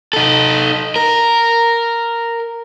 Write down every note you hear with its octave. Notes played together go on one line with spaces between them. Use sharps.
D#4 A4
A#4